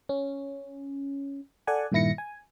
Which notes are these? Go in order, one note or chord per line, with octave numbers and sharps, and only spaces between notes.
C#4
A4 D5 F#5 G#5
G2 A#2 D#3 E4 A#6 C#7
G#5